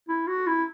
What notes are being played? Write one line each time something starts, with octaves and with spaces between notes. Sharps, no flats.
E4
F#4
E4